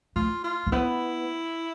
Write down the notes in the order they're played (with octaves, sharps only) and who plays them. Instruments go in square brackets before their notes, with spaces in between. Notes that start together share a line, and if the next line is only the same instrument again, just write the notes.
[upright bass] A3 [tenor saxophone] F4
[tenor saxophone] F4
[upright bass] A#3
[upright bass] B3 [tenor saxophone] E4